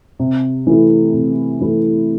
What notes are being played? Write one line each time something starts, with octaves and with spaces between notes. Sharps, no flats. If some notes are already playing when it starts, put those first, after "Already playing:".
C3
E3 A3 E4
C3
E3 A3 E4